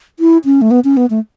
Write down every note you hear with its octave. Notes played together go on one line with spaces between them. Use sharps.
E4
C#4
A3
B3
C#4
B3
A3